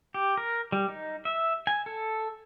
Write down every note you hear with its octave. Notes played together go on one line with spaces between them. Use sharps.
G4
A#4
G3
D#4
E5
G#5
A4